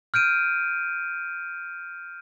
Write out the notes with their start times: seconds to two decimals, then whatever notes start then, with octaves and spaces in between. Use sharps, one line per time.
0.14 F6 G6 D7 D#7